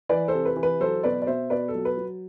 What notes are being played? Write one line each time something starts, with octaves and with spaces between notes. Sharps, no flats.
E3 B4 D5
A4 C5
C3
B4
E3
B4
F#3 A4 C5
B2 B4 D5
D5
B2 C5 E5
B2 B4 D5
A4
F#3
B4
F#3